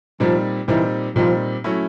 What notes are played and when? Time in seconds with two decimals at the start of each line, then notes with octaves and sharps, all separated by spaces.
0.20 A#2 F3 G3 C4 D#4
0.68 A#2 E3 G3 C4 D#4
1.16 A#2 F3 G3 C4 D#4
1.64 F#3 A3 C#4 E4